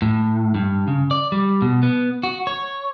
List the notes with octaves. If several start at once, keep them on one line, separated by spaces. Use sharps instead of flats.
A2
G2
C#3
D5
G3
B2
B3
F#4
C#5